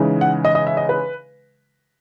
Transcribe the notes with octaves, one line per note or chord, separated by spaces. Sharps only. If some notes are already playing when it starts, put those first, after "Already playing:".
Already playing: C#3 E3 G#3 D#4
F#5
D#5
D#5
E5
D#5
B4